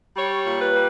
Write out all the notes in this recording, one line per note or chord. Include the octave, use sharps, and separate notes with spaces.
G3 C#5
A#2
B4
G3